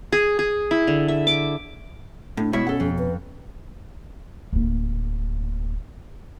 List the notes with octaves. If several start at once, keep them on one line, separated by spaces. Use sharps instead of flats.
G#4
G#4
E4
D3
E5
D6
A2 D4
B2 G#3 E4 C#5 E5
C#4 A4 F#5
F2
B4
D1 A#3